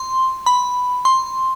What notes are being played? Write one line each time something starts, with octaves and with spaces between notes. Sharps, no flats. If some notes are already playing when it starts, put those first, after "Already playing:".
Already playing: C6
B5
C6